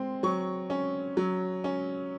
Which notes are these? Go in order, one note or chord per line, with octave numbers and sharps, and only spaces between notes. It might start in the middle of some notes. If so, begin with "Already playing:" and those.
Already playing: G#3 C4
F#3 C#6
C#4
F#3
C#4